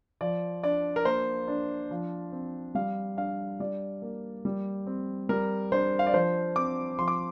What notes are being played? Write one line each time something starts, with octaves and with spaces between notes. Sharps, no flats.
F3 D5
D4 D5
A#4
A#3 C5
D4
F3
C4
G3 F5
D4 F5
G3 D5
A#3
G3
C4
G3 A#4
D4 C5
F5
D5
F3 C5
C4 D6
F3 C6
D6